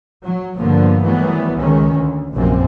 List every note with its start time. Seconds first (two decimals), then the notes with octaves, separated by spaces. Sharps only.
0.24 F#3
0.57 G2 D3 F3 A#3 B3
1.02 D#3 E3 F#3 G3 A3 B3
1.57 C#2 D#3 C#4
1.94 D2
2.32 F1 A#1 F#2 C3 A#3 C4